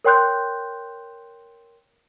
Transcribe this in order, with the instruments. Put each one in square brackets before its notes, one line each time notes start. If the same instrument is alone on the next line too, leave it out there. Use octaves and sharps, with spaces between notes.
[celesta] A#4 C#5 G5 C6 F#6 G6